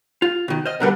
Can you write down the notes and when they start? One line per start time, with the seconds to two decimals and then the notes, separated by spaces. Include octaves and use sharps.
0.22 F4
0.48 B2 D#3
0.65 C5 D#5 F6
0.80 B2 D3 G3 A#4 B4 F#5